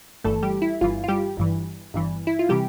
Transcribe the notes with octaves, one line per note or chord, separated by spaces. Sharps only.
G1 G2 E3 A3 A4
G3 G4
E4
G1 G2 E3 F4
F4
G3 G4
G1 G2 E3
G1 G2 E3
E4
F4
C3 E3 G3 G4